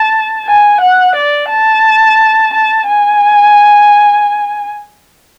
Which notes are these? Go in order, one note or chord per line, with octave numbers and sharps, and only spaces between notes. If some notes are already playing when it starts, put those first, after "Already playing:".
Already playing: A5
G#5
F#5
D5
A5
A5
G#5